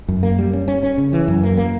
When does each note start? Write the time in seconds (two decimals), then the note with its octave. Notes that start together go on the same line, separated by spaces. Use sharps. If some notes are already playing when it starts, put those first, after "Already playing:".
0.08 F#2
0.23 A#3
0.39 G3
0.53 C#4
0.68 C#4
0.83 C#4
0.98 C#3
1.13 E3
1.28 F#2
1.43 A#3
1.57 A#3